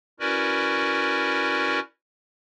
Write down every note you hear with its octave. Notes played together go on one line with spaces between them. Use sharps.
C#4 E4 F#4 A#4 B4 D5